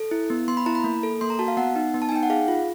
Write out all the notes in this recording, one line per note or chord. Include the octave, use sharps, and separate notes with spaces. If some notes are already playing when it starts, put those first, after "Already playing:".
Already playing: A4
E4
B3
B3 C6
B5
E4 A#5
B5
A#3
A4
A#3 C6
A#5
F#4 A5
F5
B3 F#5
D#4
B3
A5
G#5
D#4 G5
F#5
G#4 F5
F4